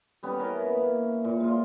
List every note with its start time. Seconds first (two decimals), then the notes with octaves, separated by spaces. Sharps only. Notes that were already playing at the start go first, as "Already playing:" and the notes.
0.23 G3 B3 C#4
0.39 C#4 E4 A#4
0.58 B3 B4
0.76 A#3
1.25 A#2
1.40 G#3 F4